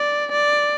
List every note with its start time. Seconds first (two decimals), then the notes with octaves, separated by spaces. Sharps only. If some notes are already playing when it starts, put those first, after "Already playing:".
Already playing: D5
0.32 D5